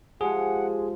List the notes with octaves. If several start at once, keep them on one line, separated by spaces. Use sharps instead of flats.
F3 G#3 G4 G#4 F#5